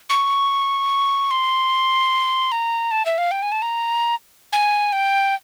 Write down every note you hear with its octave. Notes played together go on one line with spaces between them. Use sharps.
C#6
C6
A#5
A5
E5
F5
G5
G#5
A5
A#5
G#5
G5